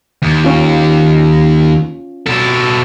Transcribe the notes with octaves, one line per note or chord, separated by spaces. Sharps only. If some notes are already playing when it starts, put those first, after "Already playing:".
D#2
C#4 F4
B2 A4